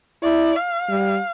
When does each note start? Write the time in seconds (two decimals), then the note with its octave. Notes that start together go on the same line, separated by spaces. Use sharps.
0.22 E4 D5
0.56 F5
0.89 G3